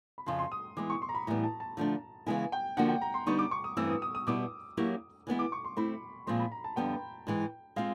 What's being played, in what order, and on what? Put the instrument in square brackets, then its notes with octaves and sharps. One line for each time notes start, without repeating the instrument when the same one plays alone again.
[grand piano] B5
[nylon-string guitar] F2 C#3 F3 [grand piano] C6
[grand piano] C6
D#6
[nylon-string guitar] E3 G#3 B3 [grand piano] D6
[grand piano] C#6
C6
A#5
B5
[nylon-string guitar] A2 E3 G3 B3 [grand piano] A#5
[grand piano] A5
A5
[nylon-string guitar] D3 F3 A3 D4
[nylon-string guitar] C#3 E3 G#3 B3 E4 [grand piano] G#5
[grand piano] G5
[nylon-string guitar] D3 F3 A#3 D4 F#4 [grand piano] F#5
[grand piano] G5
A#5
C6
[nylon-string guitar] D3 G3 B3 D#4 [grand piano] C#6
[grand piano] D6
C#6
D#6
[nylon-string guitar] G2 E3 A3 C4 [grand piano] E6
[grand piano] D#6
D#6
D#6
[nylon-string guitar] B2 G3 B3 E4 [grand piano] D6
[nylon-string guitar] F#3 A#3 C#4 E4 G4
E3 G#3 B3 E4
[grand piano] D6
C#6
C6
[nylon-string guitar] A3 C4 E4 [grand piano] B5
[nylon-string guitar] A#2 F3 G#3 C4 [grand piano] C6
[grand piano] B5
A#5
A5
[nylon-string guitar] F2 D3 G3 B3 [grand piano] G5
[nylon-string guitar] G#2 E3 G#3
[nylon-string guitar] G#3 C4 F4 [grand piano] F5